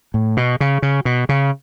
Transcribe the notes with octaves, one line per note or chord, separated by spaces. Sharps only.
A2
B2
C#3
C#3
B2
C#3